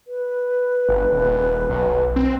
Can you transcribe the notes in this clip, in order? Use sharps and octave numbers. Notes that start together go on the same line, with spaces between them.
B4
G1
D#1
B1
C4